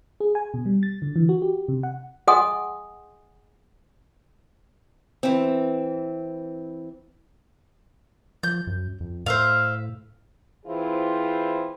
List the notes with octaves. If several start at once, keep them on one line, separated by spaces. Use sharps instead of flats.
G#4
G#5
B2
G3
A6
D3
E3
F#4
G4
C3
F#5
G#4 D#5 F#5 G#5 C6 D#6
E3 C4
F3 G6
F#2
F2
A2 C5 E5 F5
E3 C4 E4 F4 G#4 C5